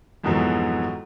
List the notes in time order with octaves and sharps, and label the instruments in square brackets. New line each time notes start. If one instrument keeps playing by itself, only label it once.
[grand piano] F2 G#2 B2 E3 F#3